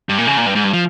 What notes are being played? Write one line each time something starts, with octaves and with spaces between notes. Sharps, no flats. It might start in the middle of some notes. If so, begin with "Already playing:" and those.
G2
A#2
C#3
A#2
G2
G#2
G2
F3